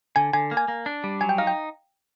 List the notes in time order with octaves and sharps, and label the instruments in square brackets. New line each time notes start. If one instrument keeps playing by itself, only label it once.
[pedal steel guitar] D3 [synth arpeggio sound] G#5
[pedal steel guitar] D3 [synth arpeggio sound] G#5
[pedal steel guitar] A#3
[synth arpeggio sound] G#5
[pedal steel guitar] A#3
D4
G3
[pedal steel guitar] F#3 [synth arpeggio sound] G#5
[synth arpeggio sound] G5
[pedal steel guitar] D#4 [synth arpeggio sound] F5
[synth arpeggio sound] G5